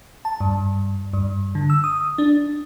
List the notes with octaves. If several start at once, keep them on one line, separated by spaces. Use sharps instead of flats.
A5
G2
G2
D3
E6
D#6
D4